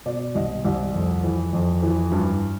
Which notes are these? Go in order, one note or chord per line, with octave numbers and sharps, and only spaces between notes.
B2 D5
C2 D#5
C2 D5
F2
E3
F2
E3
G2